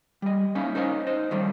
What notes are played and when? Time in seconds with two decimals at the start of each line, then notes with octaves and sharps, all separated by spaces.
0.22 G3 D#5
0.55 A#3 C#4 D#4 E4 F5
0.75 D#4 A#4 C5 C#5 D#5 F5
1.07 D#4 C5 D#5
1.31 D#3 F3 G3 A3 C#4